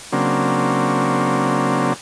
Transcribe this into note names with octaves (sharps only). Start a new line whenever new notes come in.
C#3 F#3 A#3 C4 D4